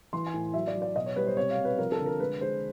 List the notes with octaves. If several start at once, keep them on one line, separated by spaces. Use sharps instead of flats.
E3 C6
G#5
A2
F#3 E5
D5
F#3
D5
B2 D#5
C#5
G3 B4
C5
C3 C#5
F5
C3
B4
F3 A#4
A4
D3
A#4
G#3 B4
G#3 C5